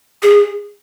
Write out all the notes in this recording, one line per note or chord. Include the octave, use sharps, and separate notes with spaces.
G#4